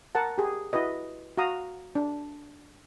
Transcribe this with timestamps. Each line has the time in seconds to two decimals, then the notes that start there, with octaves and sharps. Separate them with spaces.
0.15 A#4 F#5 A5
0.38 G4 G#4
0.73 E4 F#4 B4 D#5
1.37 F#4 F5 A#5 D#6
1.95 D4